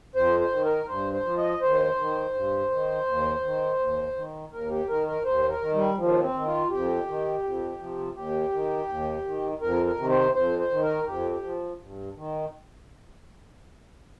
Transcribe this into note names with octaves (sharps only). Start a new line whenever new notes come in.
F2 C5
C5
D#3
A#4
G2 C5
C5
F3
D#5
D#2 C5
D#3
G2
D#3
D#2
D#3
D#2
D#3
D#2 A#4
G4
D#3 A#4
A#4
D#2 C5
A#4
D#3
G3
D#2 F3
C4
D#3
F4
F2 G4
D#3
F2
C3 F3
D#2 G4
D#3
D#2
D#3
F2 A#4
A#4
C3 D#3
C5
F2 C5
C5
D#3
A#4
F2 G4
G4
F3
G2
D#3